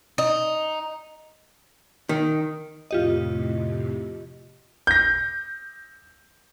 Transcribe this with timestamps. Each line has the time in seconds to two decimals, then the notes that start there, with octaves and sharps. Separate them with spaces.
0.18 D#4
2.09 D#3
2.91 F2 A2 C3 F4 G4 D#5
4.87 G6 A#6